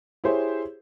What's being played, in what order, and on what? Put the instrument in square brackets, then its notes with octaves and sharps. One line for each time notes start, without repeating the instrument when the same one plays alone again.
[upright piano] E4 G4 G#4 C5 C#5